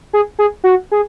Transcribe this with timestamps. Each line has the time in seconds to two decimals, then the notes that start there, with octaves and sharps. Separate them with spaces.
0.13 G#4
0.39 G#4
0.64 F#4
0.91 G#4